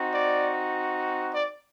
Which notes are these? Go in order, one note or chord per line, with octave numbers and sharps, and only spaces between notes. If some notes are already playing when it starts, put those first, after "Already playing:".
Already playing: C4 D#4 F#4
D5
D5